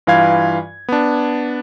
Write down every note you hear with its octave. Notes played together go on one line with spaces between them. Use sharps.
G2 E3 F4 F5 G#6
B3 D4